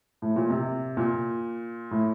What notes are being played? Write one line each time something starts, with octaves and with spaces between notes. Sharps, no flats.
A2
A#2
C3
A#2
A2